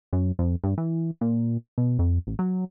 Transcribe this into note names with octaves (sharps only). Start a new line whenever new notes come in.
F#2
F2
G2
E3
A#2
B2
F2
A1
F#3